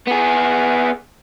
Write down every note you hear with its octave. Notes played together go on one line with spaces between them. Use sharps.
B3 G#4